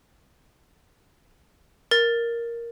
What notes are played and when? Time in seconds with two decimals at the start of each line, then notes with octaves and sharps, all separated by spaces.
1.91 A#4 A6